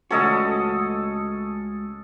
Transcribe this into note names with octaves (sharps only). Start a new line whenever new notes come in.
C#2 A3 C#4 F#4 A4 D#5